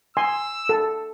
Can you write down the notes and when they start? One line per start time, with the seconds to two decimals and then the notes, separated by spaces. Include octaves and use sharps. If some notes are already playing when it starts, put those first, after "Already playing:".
0.17 G#5 C6 E6
0.69 A4